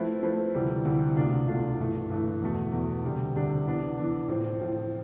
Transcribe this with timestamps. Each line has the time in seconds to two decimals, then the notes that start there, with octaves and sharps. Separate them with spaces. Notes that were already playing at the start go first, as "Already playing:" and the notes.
Already playing: F3 A3 C4 E4 B4
0.23 F3 A3 C4 E4 B4
0.55 D2 C3 E3 G3
0.85 D2 C3 E3 G3
1.16 C2 B2 A3 D4 F4
1.48 C2 B2 A3 D4 F4
1.78 G2 E3 A3
2.10 G2 E3 A3
2.42 E2 B2 A3
2.72 E2 B2 A3
3.04 D2 C3 G3 D4 G4
3.35 D2 C3 G3 D4 G4
3.66 E3 B3 D4
3.97 E3 B3 D4
4.28 A2 F3 C4
4.60 A2 F3 C4